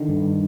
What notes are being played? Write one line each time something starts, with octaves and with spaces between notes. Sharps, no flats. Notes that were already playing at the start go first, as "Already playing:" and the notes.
Already playing: D3 D#3
G2